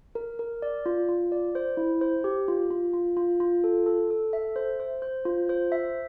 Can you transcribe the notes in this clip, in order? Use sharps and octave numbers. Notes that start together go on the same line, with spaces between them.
A#4
A#4
D5
F4
F4
D5
C5
E4
C5
G4
F4
F4
F4
F4
F4
A4
A4
A4
E5
C5
C5
C5
F4
C5
E5